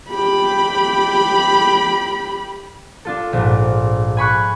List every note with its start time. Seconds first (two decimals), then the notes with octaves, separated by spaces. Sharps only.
0.11 G4 B5
3.05 D4 F4 A4
3.33 A#1 G#2
4.17 G#5 B5 C#6 F#6